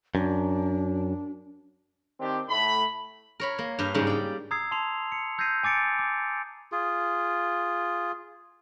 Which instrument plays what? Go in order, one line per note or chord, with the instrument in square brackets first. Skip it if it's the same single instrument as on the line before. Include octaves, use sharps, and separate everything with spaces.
[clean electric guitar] F#2 [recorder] D4
[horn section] D#3 C4 D4 G4
A2 A3 B5
[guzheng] A#4 C#5 B5
A#3
G2 G4 F5
G#2 C#3 G3 D#4
D5 G5
[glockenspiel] A#5 D#6 E6 G#6 C7
A5 C6 C7 F7
C#7
E6 G6 G#6 A#6 C7 D#7
G#5 D6 A6 C#7 D7
D6
[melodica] F4 G#4